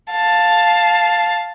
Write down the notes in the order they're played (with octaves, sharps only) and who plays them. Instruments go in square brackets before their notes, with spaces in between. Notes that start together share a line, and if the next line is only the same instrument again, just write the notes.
[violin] F5 A5